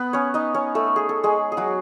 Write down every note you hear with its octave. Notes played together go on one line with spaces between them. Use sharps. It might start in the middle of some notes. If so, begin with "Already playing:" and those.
Already playing: B3 B4
C#4 C#5
D#4 D#5
C#4 C#5
A3 A4
G#4
A4
G#3 G#4
G#4
F#3 F#4